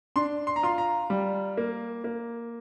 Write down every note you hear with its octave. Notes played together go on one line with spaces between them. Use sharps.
D4 C6
C6
A#5
F4 C6
A#5
G3
A#3
A#3